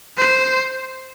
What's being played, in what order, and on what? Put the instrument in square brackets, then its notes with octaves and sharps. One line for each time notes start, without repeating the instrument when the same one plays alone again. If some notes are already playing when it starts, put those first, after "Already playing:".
[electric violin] C5